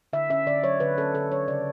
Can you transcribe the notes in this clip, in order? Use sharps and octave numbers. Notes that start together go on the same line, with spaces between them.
D3 E5
C#4 E5
D3 D5
F#3 C#5
D3 B4
C#4 A4
D3 A4
F#3 C#5
C#3 D5